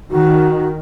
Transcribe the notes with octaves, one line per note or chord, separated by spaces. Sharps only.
D#3 F#4